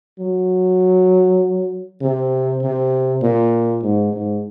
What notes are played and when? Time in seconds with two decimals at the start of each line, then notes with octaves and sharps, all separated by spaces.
0.19 F#3
2.01 C3
2.62 C3
3.22 A#2
3.83 G#2
4.13 G#2